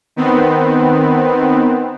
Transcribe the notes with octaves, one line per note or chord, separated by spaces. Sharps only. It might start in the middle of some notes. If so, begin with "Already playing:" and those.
D#3 B3 C4